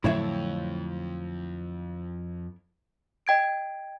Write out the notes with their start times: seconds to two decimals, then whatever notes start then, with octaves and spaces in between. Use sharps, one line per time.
0.04 F2 A2 D3 F#3 E4 C#5 E5
3.27 D#5 G5 G#6 D7